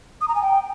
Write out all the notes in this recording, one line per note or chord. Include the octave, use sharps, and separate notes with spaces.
D#6
A#5
G#5
G5